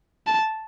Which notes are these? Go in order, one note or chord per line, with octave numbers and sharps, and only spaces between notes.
A5